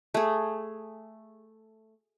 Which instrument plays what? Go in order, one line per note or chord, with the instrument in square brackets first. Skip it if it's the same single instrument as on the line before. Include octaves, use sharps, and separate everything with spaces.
[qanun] A3 G#4